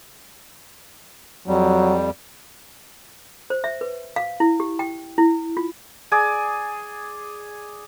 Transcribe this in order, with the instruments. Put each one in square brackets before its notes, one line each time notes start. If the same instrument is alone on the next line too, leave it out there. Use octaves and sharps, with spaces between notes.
[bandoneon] F2 G3 [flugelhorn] F#3
[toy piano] C5
E5
B4
F5
E4
G4
G5
E4
F4
[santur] G#4 D5 G#5